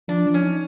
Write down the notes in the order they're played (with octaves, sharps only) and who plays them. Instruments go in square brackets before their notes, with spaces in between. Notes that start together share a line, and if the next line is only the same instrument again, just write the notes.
[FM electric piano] F3 [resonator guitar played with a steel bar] D4
[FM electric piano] F3
[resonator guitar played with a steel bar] C#4
[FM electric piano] D#4